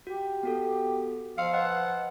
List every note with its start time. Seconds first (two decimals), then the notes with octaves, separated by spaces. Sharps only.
0.07 F#4 G4
0.43 B3 F#4 A4
1.38 F3 F5 C6 E6 C#7
1.53 B4 D#5 F#5